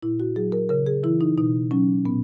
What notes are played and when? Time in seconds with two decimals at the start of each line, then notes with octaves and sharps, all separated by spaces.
0.02 A#2 E4
0.20 F#4
0.36 F#3 G#4
0.52 A#4
0.69 C#3 A#4
0.87 G#4
1.03 E3 E4
1.21 D#4
1.38 B2 D#4
1.71 F#3 C#4
2.05 A#2 B3